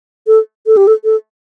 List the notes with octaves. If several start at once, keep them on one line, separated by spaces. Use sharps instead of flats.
A4
A4
G4
A4
A4